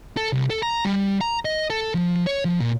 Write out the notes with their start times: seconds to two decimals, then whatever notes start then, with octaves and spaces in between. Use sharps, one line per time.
0.17 A4
0.33 C2
0.50 A4
0.63 A#5
0.85 G3
1.21 A#5
1.45 D#5
1.70 A4
1.95 F3
2.27 C#5
2.45 F3
2.60 A#2